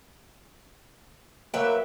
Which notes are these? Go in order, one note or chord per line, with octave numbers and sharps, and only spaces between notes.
F#3 A#3 B4 E5 G5